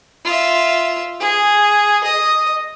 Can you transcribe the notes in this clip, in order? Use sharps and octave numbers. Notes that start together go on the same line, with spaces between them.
F4 E5
G#4
D#5